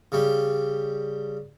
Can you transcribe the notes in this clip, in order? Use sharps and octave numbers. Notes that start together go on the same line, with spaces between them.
C#3 G3